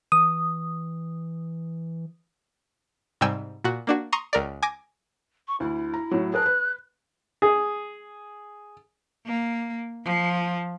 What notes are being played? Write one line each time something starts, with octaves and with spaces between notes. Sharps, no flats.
E3 D#6
G#2 C3 G3 G5 G#5 E6
A#2 F#4
A#3 D4 F#4
A#5 C6 C#6 D#6
C#2 A#4 D5
G#5 D6 A#6
C#6
D2 E4
A#5
A2 F#3
G#4 A#4 A5 F#6
B4
G#4
A#3
F3